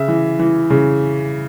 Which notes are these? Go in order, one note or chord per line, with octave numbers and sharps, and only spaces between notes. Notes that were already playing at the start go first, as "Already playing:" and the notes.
Already playing: C#3 E5
E3
E3
C#3